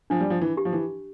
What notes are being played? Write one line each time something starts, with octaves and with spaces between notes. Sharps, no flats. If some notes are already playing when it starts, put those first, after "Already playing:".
F3 D4
G3
F3
E3
G4
F3
E3